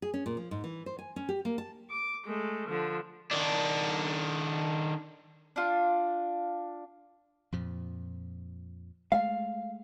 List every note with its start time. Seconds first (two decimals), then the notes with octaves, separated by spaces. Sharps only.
0.02 G#4
0.14 C#4
0.26 A#2
0.37 F3
0.51 G#2
0.64 E3
0.86 C5
0.99 G#5
1.16 C#4
1.29 G4
1.45 A#3
1.58 A5
1.90 D6
2.26 G#3 A3
2.69 D3 F3
3.31 D#3 D4
5.56 D4 F4
7.52 F2 A#2 F3
9.12 G#3 A3 F5